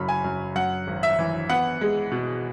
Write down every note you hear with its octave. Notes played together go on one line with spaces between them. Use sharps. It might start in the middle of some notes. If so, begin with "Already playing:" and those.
Already playing: F#1 F#2 B5
G#5
F#2
F#2 F#5
G#1
E5
E3
B3 F#5
G#3
B2